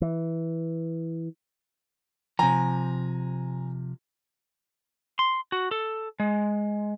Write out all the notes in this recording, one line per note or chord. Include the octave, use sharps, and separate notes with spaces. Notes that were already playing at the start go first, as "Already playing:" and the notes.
E3
C3 F3 G#5 A#5
C6
F#4
A4
G#3